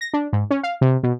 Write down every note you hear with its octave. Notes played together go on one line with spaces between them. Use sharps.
A#6
D4
G#2
C#4
F5
C3
B2